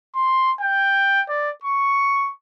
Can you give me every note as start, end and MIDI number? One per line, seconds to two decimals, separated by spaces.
0.15 0.52 84
0.61 1.22 79
1.29 1.50 74
1.64 2.30 85